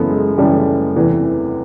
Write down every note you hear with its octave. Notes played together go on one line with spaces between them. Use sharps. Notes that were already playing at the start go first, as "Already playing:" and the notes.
Already playing: F#2 C#3 E3 A3 B3
G#3
F#2 C#3 E3 G3 A3
E2 C3 E3